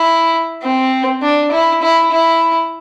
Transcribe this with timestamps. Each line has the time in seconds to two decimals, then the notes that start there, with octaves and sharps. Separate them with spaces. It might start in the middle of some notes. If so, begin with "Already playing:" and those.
Already playing: E4
0.62 C4
1.22 D4
1.51 E4
1.82 E4
2.12 E4